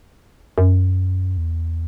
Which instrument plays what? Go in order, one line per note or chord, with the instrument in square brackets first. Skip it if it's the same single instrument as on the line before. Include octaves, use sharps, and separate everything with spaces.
[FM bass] F#2
E2